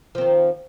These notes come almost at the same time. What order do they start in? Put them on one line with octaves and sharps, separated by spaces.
F3 C4 D#3